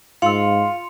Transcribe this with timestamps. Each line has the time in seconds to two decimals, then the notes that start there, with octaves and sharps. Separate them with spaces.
0.22 G#2 F4 F5 C6 E6 C#7 F7